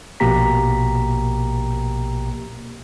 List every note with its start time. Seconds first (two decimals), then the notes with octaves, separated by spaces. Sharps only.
0.20 A#1 B2 A#3 G4 A#5 B6